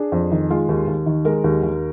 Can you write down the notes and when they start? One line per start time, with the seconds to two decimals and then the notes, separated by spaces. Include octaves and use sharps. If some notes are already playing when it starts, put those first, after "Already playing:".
Already playing: D4 G#4
0.12 F2
0.31 D#3
0.50 G#3 F4
0.69 D#2
0.87 D#2
1.06 D#3
1.25 G#3 A#4
1.44 D#2
1.63 D#2